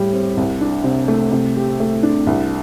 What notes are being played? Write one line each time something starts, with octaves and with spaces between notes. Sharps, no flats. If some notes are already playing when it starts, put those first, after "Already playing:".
Already playing: A2 G3 G4
C4
C2
D4
C3
A3
C3
G4
A3
D4
C2